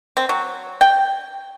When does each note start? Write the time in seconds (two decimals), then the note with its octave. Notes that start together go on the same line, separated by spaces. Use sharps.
0.17 C4
0.29 F#3
0.81 G5